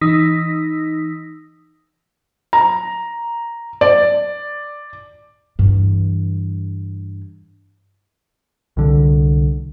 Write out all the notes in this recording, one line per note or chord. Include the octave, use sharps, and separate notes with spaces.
E3 D#4 D#6 E6 A#6 B6
A#5
D5
G2 E3
C2 D3